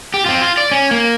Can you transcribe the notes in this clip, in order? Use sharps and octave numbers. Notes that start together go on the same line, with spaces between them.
G4
C4 F4
F4
D5
C#4
A#3